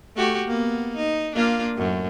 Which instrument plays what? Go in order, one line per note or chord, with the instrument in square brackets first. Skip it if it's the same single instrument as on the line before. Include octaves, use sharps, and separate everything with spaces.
[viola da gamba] A3 F#4 G4
A#3 B3
D#4
A#3 D4 F4
F#2 A2